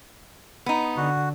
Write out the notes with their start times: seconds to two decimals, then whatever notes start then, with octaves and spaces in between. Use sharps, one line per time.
0.66 B3 D#4
0.97 D3 F#4